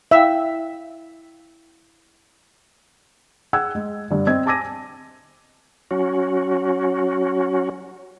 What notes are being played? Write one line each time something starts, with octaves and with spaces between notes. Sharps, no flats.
E4 E5 F5 G5
G#4 F#5 E6 G#6
G#3
G2 D3
C4 D#5 G#6
G#5 A5 D6 G#6 A#6 D#7
F#3 C#4 F#4